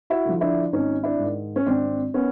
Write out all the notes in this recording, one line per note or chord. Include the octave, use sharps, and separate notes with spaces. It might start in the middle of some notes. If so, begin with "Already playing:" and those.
E4 F#4
D3 F3
D4 E4
G#1 C#4 D#4
D4 E4
G#2 D#3
C#4
G#1 C4 D4
D#3 B3 C#4